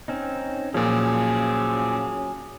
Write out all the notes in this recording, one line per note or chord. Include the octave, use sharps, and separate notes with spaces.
C4 C#4 D#4
A#2 F3 F#3 C#4 G#4